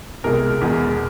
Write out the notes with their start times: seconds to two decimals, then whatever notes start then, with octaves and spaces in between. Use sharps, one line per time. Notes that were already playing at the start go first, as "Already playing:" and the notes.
0.24 C2 B2 G#3 A#4
0.61 E2 B2 G#3